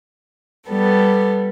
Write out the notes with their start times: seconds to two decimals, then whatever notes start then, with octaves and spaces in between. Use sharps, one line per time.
0.69 G3 B3 A4